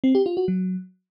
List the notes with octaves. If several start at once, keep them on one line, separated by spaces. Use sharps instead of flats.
C4
G4
F4
F#4
F#3